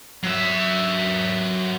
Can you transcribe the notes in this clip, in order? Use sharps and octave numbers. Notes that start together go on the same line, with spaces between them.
F#3 E5